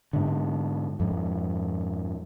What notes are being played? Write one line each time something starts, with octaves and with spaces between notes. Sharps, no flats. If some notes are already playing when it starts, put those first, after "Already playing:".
G#2 D3
F2 G#2